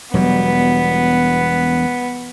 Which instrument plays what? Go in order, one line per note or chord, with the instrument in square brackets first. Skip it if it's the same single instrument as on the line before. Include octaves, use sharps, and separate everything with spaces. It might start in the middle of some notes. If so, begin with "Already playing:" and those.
[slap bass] E1 F#3 G3 [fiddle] B3